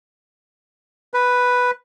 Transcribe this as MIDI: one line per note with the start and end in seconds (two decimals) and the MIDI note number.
1.14 1.71 71